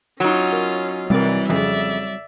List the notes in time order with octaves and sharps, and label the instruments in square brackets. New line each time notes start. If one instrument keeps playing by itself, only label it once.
[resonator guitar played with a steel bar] F#3 D#4 [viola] C#4 F4
[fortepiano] A#4
[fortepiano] C2 A#4 [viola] E3 D5 [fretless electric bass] G3 A3 C4
[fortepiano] F2 C#3 [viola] D5 E5